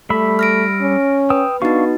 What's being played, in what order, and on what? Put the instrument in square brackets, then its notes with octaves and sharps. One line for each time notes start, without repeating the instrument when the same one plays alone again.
[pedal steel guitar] G3 E5 B5 [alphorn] A3
[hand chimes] F6 A#6 D7
[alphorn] C#4
[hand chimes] B4 [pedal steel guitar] G5 D#6 E6
[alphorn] B3 [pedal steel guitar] D4 F5 C#6 [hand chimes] D#4 F#4